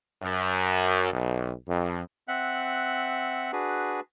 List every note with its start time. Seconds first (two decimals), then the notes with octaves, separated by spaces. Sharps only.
0.23 F#2
1.12 B1
1.68 F2
2.28 C4 E5 F#5 F#6
3.52 D4 F#4 G#4 B4